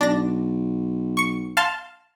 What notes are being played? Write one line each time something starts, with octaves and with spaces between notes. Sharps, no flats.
B1 D4 A#6
C#6 C#7
F5 A5 C6